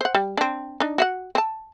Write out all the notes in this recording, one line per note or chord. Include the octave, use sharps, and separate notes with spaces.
C5 F#5
G3
C4 D4
D4 D#4
F#4 F5 F#5
C4 A5